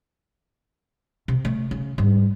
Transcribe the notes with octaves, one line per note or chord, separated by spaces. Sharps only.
C3
A3
C#3
G#2 G3